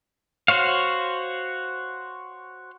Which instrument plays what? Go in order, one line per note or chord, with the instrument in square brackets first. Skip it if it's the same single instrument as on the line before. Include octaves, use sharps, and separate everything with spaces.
[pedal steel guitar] F#4 C5 C#5 F5